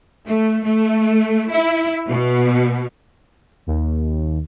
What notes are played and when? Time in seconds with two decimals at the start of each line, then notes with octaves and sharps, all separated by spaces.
0.26 A3
0.64 A3
1.50 E4
2.07 B2
3.67 D#2